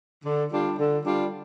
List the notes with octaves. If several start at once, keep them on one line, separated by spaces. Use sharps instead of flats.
D3
G3 D4 F4
D3
G3 D4 F4